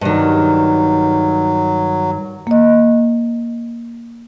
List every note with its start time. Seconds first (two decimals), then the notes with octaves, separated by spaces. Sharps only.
0.01 G2 D#3 F#3
2.47 A#3 D#5